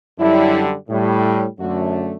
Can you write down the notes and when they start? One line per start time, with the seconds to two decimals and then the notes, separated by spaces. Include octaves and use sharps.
0.19 F#2 D3 G3 E4
0.89 A2 G3
1.59 F#2 D3 A3 F#4